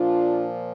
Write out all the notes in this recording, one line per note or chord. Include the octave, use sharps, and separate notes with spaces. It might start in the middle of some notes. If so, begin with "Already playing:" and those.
Already playing: A#2 F3 D4 F4